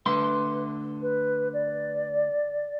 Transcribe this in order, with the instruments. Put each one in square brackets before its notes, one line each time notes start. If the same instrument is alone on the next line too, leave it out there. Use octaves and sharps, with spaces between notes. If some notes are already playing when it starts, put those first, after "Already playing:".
[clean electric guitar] D3 A3 C6 [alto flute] B4
[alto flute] B4
D5